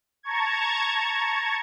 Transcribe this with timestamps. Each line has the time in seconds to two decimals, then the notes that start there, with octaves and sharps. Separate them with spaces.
0.23 A5 A#5 C#6 G#6